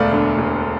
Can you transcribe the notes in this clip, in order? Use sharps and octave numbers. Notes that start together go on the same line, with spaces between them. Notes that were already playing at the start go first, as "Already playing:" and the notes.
Already playing: E1 D2 A3 D5 F5
D3
E1